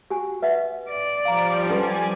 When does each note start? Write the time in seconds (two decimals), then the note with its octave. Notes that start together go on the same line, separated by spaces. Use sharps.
0.10 F#4 G4 G#5
0.42 B4 D#5 E5 F#5
0.90 D5
1.25 F3 G3 F5 A#5
1.69 G3 C#4 A4 B4 D5 G#5 C6